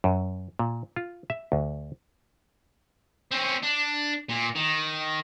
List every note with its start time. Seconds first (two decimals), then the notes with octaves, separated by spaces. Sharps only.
0.04 F#2
0.59 A#2
0.96 F4
1.30 E5
1.52 D2
3.31 C4 C#4
3.62 D4
4.29 A#2
4.55 D#3